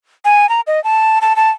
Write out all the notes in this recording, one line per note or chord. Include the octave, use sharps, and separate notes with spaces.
G#5
A#5
D#5
A5
A5
A5